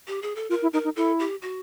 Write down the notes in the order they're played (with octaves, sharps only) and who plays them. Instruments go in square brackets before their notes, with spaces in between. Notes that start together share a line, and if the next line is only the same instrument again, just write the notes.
[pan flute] G4
G#4
A4
[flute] F4 [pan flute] A#4
[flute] E4
[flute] D#4 [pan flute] A#4
[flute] D#4
[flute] E4 [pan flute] A4
[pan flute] G4
F#4